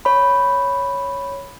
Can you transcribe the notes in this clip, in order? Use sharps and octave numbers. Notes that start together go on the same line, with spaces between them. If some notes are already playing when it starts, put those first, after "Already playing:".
C#5 B5